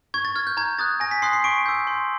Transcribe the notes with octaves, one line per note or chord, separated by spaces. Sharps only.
C#6 G#6
A6
F6 G#6
G6
A#5 G#6
D#6 F#6 A6
G#5 A#6
B6
C6 D#6 F#6 C7
C7
C#6 D7
E6 G6
C6